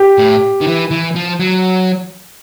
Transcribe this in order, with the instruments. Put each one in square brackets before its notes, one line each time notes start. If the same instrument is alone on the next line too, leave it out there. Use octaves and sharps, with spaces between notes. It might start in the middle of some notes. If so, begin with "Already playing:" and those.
Already playing: [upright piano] G4
[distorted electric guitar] A2
D#3
E3
E3
F3
F#3